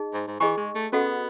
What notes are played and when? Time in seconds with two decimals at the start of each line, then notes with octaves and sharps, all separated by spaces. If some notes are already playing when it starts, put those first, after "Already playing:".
Already playing: D#4 G#4 D#5
0.14 G#2
0.27 G#2
0.40 E3 G#4 D#5 G#5 C#6
0.57 G#3
0.75 A3
0.93 B3 C#4 F#4 A4 D#5 F#5